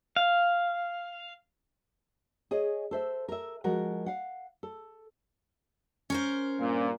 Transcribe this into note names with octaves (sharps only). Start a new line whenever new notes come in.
F5
G#4 C#5 D#5
A4 C5 E5
A#4 E5
F3 G#3 F#4 A#4 F#5
F5 F#5
A4
C#4 A#4 C5
G2 A#2 A#3